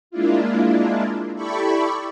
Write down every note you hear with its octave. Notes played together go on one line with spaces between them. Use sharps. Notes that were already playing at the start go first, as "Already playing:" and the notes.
G#3 A#3 D4 E4 F4
E4 G4 A4 D5 B5 C#6